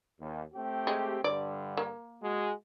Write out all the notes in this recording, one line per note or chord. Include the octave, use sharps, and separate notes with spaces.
D#2
A3 C4 G4
G#3
G2 D3 D5
A#3
G#3 F#4